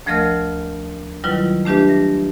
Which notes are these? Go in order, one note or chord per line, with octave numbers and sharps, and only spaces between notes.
D2 F3 A3 A#4 D#5 F6
D#3 F#3 G3 E4 F4 B4
A3 D4 G4 B4 E5
A#6